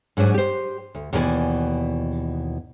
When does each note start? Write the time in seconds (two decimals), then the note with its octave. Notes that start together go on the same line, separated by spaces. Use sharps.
0.17 G#2 F#3 D4 C5 G#5
0.34 G4 C5
0.95 D2
1.13 D#2 B2 E3 A4 D5 G#5